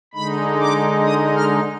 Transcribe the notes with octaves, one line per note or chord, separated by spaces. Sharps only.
D3 G#3 D#4 B5
D6
D#6
F6